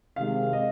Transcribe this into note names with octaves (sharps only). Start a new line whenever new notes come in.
C3 D#3 G#3 F5
D#5